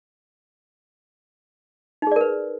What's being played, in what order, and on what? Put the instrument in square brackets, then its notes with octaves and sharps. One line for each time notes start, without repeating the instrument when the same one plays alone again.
[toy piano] D#4
G#4
D5
A#4
B4